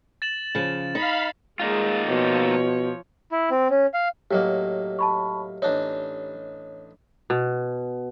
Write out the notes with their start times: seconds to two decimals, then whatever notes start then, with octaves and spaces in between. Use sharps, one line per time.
0.22 A6 E7 F#7
0.55 C#3 F3
0.95 D#4 F5 B5
1.60 G#3 A#3 D#4 F4 G#4
2.09 B2 F3 C#5
3.32 E4
3.51 C4
3.70 C#4
3.94 F5
4.31 A2 F#3 A#3 G4 D#5
4.99 A5 B5 C#6
5.62 A1 D4 D#4 C#5
7.30 B2